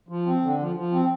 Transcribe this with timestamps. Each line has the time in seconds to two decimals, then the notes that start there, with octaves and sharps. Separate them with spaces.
0.09 F3
0.26 C4
0.42 D3
0.59 F3
0.76 F3
0.92 C4